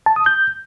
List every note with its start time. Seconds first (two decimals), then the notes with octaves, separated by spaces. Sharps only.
0.06 A5
0.16 D#6
0.26 G6